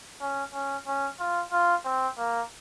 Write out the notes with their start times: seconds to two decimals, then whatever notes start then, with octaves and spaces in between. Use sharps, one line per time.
0.21 C#4
0.54 C#4
0.87 C#4
1.20 F4
1.52 F4
1.85 C4
2.18 A#3